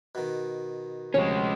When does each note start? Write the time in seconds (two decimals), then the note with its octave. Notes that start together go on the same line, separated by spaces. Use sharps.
0.15 B2 D#3
1.14 D2 C3 F3 G#3 C#4 C#5